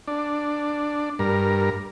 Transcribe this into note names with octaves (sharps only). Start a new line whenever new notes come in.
D4
G2 A#4